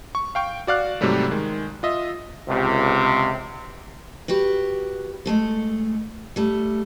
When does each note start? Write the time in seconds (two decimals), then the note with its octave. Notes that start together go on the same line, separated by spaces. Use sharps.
0.15 C#6
0.35 F5 G5 C#6
0.67 F#4 D5 F5 F#6
1.01 G#2 C3 F#3 G3 A3
1.31 D#3 G#3
1.83 F4 D#5 E5
2.48 C#2 C3
4.28 F#4 G4 B4
5.26 G#3 A3 A4
6.36 G3 A3